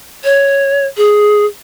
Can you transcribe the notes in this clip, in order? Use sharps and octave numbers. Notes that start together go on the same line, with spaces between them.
C#5
G#4